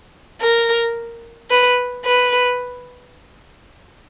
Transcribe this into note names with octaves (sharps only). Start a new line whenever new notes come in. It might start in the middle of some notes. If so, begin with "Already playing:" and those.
A#4
B4
B4